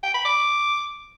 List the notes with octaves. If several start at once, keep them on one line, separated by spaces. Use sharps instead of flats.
G5
B5
D6